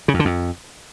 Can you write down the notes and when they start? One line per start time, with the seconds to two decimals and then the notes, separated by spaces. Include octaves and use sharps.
0.08 C#3
0.14 F2
0.19 D3
0.25 F2